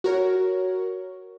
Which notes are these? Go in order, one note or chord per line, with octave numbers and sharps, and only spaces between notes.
F#4 A#4 C#5